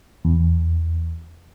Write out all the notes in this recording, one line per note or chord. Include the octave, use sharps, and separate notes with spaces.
E2